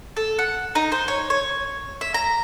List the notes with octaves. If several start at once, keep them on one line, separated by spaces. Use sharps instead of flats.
A4
F#5
D#4
C5
C#5
C#5
E5
A#5